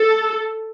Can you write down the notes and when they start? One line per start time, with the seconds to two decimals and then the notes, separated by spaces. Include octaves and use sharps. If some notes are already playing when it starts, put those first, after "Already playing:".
Already playing: A4